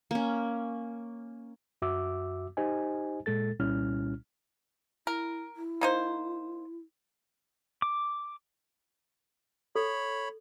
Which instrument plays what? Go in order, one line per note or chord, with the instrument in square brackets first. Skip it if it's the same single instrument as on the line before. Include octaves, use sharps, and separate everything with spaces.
[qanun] A#3 C#4
[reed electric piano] F#2 F#4 E5 D6 E6
D#4 G4 C5 D#5 G#5
A#2 G#3 A4 A6
C2 A#2 G3 C#4 E4 F6
[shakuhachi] E4 [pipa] A#4
[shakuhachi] E4
[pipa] A#3 D#4 C5
[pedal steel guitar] D6
[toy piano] A4 [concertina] C#5 B5